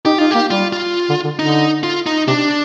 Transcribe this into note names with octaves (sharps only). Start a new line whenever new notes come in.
D#4 G4
D#4 F4
A#3 G4
G3 F4
F4
D3
D3
D3 D#4
F4
D#4
C3 D4